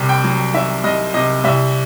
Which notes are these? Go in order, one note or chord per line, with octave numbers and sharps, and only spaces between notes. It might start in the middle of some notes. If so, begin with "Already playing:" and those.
Already playing: C2 C3
G5
F#3
D#3 E5
C2 D#5
C3 D#5
C2 E5